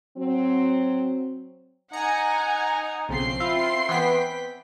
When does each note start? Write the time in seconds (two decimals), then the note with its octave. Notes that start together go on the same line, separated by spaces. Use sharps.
0.18 F#3 C4
1.93 D#4 F#5 G#5 A#5
3.09 B1 C#3 F3 C4 C6 C7
3.40 E4 F4 E5
3.89 E3 B3 G5 B6